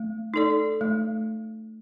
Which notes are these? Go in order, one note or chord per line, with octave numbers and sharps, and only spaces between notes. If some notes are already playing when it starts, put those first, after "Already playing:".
Already playing: A3
D#4 A4 D5
A3